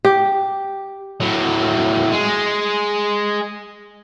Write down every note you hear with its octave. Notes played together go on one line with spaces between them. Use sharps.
G4
A2 F#3
G#3